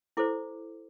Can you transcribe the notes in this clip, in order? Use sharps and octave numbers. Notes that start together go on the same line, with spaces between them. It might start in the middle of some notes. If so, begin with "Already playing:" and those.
E4 A4 C5 D6